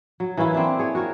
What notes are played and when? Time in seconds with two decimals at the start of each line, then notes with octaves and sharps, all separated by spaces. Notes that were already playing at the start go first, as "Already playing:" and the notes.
0.20 F#3
0.37 E3 A#3 C#4 E4
0.54 C4 D4 E4
0.79 G#4 C#5
0.95 F#4 A#4 C#5